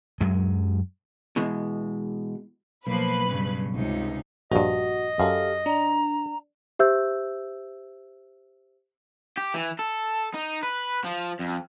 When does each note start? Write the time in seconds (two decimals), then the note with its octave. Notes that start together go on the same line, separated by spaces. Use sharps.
0.21 F#2 F#3 G#3
1.36 B2 E3 G#3
2.87 B1 F3 A#3 B4
3.29 G2 C#3
3.74 C#2 C3 D#4
4.52 A#1 G2 F#4 D#5
5.20 F#2 G4 A4 F5
5.66 D4 A#5
6.79 G4 C5 E5 E6 G6
9.37 G4
9.54 E3
9.79 A4
10.34 D#4
10.63 B4
11.05 F3
11.40 F2